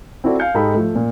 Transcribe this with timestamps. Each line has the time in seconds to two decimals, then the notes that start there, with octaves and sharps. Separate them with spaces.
0.24 C4 E4 F#4 A4 D5
0.39 F5 G#5 F6 G6 C#7
0.54 G#2 D#4 G4 A4 G5 B5
0.74 F3 A3
0.95 A#2